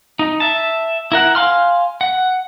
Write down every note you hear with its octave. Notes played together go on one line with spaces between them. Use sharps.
D#4
E5 A5
E4 A#4 F#5
F5 G#5 C6 F6
F#5